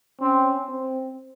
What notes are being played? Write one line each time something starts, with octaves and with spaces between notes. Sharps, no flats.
C4 C#4
C4